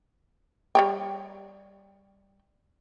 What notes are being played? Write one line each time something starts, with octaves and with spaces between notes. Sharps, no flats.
G3 C#5 G5